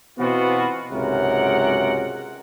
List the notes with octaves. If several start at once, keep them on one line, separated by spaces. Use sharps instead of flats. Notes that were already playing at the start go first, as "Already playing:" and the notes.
B2 E3 B3 C4 F4 F#4
C#2 G#2 C3 F#3 A#4 F#5